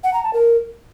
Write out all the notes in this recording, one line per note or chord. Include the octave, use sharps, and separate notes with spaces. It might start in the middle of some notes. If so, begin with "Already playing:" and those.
F#5
A#5
A5
A#4